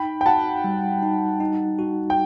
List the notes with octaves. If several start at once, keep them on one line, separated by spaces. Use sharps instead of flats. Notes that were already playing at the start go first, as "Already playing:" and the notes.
Already playing: D#4 G5 B5
G5
F#4 F#5 A5
G3
D#4
D#4
F#4
G5